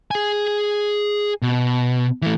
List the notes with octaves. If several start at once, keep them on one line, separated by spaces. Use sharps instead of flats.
G#4 G#5
B2
E3 A3